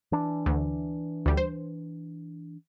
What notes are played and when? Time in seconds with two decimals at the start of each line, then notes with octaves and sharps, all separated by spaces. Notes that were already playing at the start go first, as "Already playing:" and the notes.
0.12 E3 D4
0.46 D2
1.26 D2 G3
1.37 C5